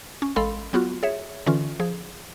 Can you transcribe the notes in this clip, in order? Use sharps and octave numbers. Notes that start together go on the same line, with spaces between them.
C#4
A1 G#3 A4 F5 B5 C6
F#3 B3 F4 F#4
G#4 C#5 E5
D3 E3 C#4 F4
F3 G#4